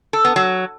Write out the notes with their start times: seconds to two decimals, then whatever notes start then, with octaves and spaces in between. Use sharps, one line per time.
0.13 A4
0.25 B3
0.36 F#3